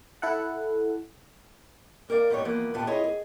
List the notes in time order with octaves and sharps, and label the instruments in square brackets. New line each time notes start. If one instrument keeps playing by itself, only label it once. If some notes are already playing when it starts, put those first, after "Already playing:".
[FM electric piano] E4 A4 F#5
[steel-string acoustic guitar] A#3 A#4 C5 D5 F5
E2 G#2 B3 D#4 G4 C#5
E3 F3 A#3 B3
D#2 A#2 B3 F4 G4 A5
E4 F4 G#4 C#5 D#5
G#4